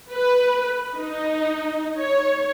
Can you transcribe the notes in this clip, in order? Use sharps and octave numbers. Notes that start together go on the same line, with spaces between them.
B4
D#4
C#5